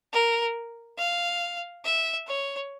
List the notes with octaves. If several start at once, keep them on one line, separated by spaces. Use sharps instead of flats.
A#4
F5
E5
C#5